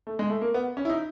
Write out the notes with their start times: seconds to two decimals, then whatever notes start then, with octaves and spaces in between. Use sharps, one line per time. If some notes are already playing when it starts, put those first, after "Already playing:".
0.07 A3
0.19 G#3
0.30 A3
0.41 A#3
0.54 B3
0.77 C#4
0.85 E4
0.89 D#4